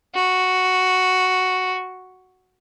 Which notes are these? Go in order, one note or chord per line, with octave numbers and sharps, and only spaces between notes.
F#4